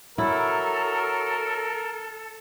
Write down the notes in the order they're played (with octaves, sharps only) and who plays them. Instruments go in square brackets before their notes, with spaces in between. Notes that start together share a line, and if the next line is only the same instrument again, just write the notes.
[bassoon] F#3 [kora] E4 [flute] A4 [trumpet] A#4